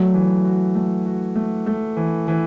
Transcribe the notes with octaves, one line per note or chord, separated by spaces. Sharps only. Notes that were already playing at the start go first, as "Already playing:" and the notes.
Already playing: F#3 A3
E3
F#4
A3
F#4
A3
A3
E3
E3